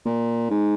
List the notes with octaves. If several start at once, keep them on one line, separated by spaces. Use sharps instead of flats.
A#2
G#2